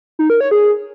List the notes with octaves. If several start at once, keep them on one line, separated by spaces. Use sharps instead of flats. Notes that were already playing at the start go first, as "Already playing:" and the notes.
D#4
A#4
C#5
G#4